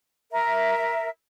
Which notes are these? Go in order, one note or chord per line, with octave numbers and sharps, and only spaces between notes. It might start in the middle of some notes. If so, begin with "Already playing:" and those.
A#4 E5